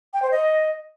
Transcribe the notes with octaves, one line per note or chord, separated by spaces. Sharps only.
G5
C5
D#5